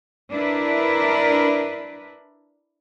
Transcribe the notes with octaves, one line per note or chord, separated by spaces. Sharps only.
D4 E4 A#4 B4